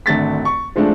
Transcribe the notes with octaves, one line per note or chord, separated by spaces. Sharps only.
G#1 D3 A3 A6 B6
C#6
F3 G#3 A3 C4 D4